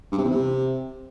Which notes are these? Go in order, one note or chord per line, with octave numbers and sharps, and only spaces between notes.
G2
C3
E2
C3